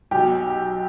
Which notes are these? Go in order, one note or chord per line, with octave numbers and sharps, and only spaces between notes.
B1 B2 G4